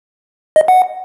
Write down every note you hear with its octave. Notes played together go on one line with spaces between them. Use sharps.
D#5
F#5